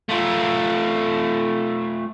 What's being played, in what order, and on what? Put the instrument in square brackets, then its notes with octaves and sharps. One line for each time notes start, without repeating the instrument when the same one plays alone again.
[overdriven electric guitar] A3 F4